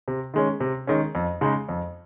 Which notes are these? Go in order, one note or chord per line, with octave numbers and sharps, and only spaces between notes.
C3
D#3 G#3 C#4
C3
D#3 G#3 C#4
F2
C#3 G#3 D#4
F2